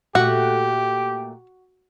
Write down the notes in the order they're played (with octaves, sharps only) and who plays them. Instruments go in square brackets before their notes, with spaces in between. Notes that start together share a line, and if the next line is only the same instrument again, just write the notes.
[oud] A#2 A3 [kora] F#4 [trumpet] G4 [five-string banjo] F#5